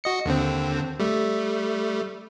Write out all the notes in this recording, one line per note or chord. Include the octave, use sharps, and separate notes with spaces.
F#4 D#5 C#7
D#2 D3 C4
G3 A3